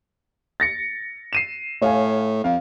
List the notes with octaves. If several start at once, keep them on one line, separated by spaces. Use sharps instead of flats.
A6 A#6 C#7
C7 D#7 E7
A2 C#5 F5 G#5
F2 F5